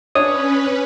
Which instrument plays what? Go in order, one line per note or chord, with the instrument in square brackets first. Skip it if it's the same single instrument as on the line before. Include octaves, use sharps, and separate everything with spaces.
[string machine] C#4 B4 [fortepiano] D4 C#5 [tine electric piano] D#6